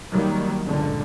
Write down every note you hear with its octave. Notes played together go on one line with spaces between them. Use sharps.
D#3 F#3 G3 A#3
G1 C#2 A#2 D3